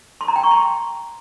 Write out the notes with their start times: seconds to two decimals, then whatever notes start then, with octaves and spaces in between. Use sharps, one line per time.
0.21 C6
0.28 A#5
0.36 G5
0.43 C#6
0.51 C6